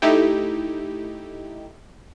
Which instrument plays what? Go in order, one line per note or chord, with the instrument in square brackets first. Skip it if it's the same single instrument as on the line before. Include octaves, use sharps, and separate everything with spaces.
[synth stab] A3 D#4 E4 G4